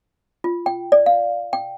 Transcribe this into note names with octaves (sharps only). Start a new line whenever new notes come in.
F4
G5
D5
F5
G5